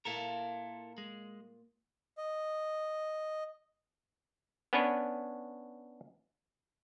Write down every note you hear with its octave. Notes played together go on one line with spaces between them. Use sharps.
A#2 A#3 E4 A4 A#4
G#3
D#5
B3 C#4 D4 B4 C#5